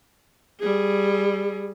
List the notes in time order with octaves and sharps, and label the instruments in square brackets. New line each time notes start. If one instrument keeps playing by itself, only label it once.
[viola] G3 G#4